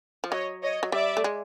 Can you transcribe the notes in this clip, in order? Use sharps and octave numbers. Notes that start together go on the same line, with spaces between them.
F3
F#3 C#5 D#5
C#5 D#5
F#3
G3 D5 E5
A3
G#3